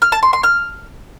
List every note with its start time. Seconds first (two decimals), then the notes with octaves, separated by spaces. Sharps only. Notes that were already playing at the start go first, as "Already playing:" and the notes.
0.02 F6
0.12 A5
0.23 C6
0.33 C6
0.43 F6